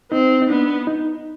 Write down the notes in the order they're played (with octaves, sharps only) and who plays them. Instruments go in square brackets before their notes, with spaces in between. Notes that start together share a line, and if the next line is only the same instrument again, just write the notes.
[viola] C4 [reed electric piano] D#4
[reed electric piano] D#4
[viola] B3 [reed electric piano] D4
[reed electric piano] D#4